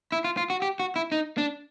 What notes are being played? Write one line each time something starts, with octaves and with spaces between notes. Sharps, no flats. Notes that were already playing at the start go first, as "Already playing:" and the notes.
E4
F4
F4
F#4
G4
F#4
E4
D#4
D4